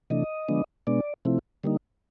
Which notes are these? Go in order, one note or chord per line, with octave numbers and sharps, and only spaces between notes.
C3 E3 A3 D4 D#5
D3 F3 G#3 B3 D4
B2 G#3 B3 D4 D5
C3 F3 A3 C4 E4
D3 G3 A#3 D#4